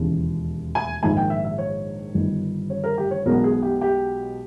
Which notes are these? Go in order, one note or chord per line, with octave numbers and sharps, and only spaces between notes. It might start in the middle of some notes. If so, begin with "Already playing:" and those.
Already playing: E1 D#2 C#3 E3
G#5
A#1 G#2 D#3 A#3 G#5
G5
E5
E5
C#5
G1 G2 D#3 G3
C#5
A#4
G4
C#5
B1 B2 G#3 B3 A#4
G#4
G4
G4